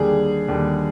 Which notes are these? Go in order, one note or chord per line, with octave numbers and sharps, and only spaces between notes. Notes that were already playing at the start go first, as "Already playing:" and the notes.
Already playing: D#2 D3 G3 G#4
D#2 D3 G3